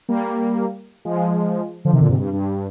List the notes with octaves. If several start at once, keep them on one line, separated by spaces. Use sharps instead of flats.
G3 A#3
F3 G#3
D3 F3
C3 D#3
A#2 D3
G#2 C3
G2
G2